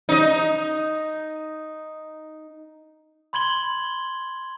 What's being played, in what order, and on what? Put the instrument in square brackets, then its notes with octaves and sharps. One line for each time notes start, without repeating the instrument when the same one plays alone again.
[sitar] D#4 D#5
[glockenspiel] B5 C6 G#6 F#7 G7